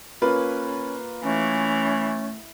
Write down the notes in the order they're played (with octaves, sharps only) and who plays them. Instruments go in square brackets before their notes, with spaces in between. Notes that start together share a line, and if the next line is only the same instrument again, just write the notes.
[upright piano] A#3 F4 B4 [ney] C#4
[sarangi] E3 [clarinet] A3 [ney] C#4